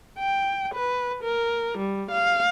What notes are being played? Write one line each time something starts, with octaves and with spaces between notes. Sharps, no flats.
G5
B4
A#4
G3
F5